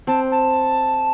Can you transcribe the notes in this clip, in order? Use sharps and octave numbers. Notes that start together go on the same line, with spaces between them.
C4 A5
A5